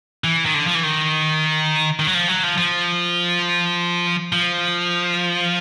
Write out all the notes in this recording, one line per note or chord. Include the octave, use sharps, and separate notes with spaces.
E3
D#3
D3
F3
E3
D#3
D#3
F#3
F3
F#3
F3
F3
F3